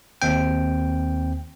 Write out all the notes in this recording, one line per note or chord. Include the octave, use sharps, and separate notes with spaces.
D#2 C4 G5